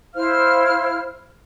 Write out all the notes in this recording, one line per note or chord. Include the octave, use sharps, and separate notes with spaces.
E4 C5 F5 F6